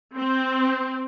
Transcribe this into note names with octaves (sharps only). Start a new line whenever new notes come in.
C4